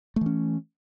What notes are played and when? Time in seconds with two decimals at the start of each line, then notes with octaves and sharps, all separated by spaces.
0.16 A3
0.21 E3
0.26 C#4